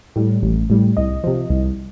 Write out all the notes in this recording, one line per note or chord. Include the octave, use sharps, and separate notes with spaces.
A2 G3
A1
A2 G3
C2 D#5
C3 F3
C2